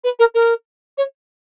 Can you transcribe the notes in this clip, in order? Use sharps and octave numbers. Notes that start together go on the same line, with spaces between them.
B4
A#4
A#4
C#5